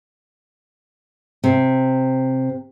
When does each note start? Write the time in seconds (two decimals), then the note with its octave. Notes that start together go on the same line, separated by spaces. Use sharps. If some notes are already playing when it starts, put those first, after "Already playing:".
1.44 C3